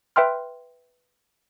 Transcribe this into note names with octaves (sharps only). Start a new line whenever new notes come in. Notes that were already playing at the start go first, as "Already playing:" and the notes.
B4 E5 G5 C6 F6